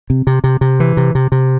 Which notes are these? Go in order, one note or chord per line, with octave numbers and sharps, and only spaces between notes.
C3
C3
C3
C3
E3
C3
C3
C3